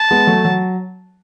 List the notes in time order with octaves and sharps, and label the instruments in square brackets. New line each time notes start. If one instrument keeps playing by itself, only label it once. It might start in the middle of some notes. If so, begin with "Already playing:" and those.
Already playing: [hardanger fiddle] A5
[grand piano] G#3 B3
F#3 A3
F#3